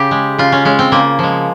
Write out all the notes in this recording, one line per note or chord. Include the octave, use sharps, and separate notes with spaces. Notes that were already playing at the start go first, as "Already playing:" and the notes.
Already playing: C#3 G4
G#3
C#3 F4
C#4
G#3 C#4
C4
C#3 A#3
F3 G#3